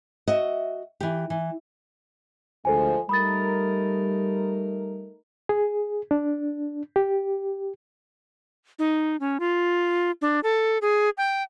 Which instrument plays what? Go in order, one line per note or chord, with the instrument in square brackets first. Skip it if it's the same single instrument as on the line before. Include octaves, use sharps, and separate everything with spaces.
[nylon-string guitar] F#4 D#5 E5
E3 G4
E3
[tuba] D2 [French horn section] F3 G#3 [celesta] A4 C5 G#5
[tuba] G3 [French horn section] A3 D#4 A#4 [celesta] B5 D#6 A6
[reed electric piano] G#4
D4
G4
[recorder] D#4
C#4
F4
D4
A4
G#4
G5